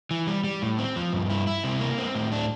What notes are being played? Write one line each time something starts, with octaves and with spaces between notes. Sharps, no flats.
E3
G3
G3
A2
C4
F3
G2
E4
E4
C3
A#3
C4
A2
D4